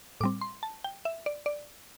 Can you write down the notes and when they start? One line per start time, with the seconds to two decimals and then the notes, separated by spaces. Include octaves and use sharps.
0.21 A2 G3 C4 D6
0.41 C6
0.63 A5
0.84 G5
1.05 E5
1.26 D5
1.46 D5